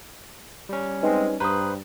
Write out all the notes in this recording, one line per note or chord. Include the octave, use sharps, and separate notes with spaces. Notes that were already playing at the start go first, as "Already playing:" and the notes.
G3 C#4
G#3 C4 D#4 B4 D#5
G2 B4 C5 A#5 D#6